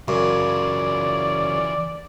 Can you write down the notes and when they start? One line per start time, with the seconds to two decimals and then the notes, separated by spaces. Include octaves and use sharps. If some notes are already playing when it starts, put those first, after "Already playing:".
0.08 F#2 C#3 E3 F4 D5